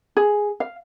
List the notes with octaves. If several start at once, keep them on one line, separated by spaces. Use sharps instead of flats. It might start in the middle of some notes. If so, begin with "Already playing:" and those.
G#4
F5